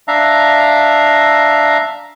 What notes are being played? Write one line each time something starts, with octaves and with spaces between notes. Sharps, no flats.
D4 E5 F5 A#5